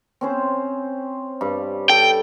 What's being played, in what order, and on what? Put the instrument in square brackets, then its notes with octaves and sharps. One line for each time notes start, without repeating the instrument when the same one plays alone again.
[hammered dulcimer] C4 C#4 C5
G2
[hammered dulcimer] A4 [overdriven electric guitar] G5